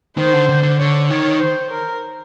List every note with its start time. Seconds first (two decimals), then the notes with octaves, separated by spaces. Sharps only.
0.18 D#3 C5
0.33 D3
0.49 D3
0.63 D3
0.79 D3 C#5
1.10 D#3 C#5
1.41 C5
1.71 A#4